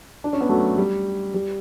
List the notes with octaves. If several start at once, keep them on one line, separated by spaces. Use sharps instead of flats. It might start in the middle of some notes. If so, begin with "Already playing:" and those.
D4
C#4
B3
F#3 A3
G3
G3